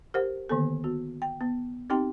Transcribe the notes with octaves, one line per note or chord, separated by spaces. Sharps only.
G4 A#4 C5 F#5
D3 D#3 A#3 B3 A4
B3 F#4
G5
B3
C4 D#4 G4 G5 C6